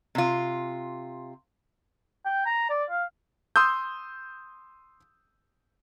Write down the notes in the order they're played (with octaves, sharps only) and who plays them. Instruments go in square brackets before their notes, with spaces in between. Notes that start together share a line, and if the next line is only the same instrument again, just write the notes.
[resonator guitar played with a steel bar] C3 F4
[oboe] G5
A#5
D5
F5
[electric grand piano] C6 D#6 E6 G6